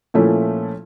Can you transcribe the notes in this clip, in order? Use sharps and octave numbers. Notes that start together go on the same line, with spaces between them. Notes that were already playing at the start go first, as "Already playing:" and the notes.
A#2 F3 A3 C#4 E4